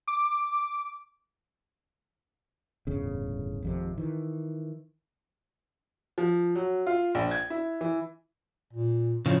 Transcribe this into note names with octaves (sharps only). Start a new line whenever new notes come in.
D6
D1 G1 E2 C#3
G#1 F2 C3
D#3 E3
F3
F#3
F4
A#1
G#6
E4
E3
A#2
A2 C#3 F3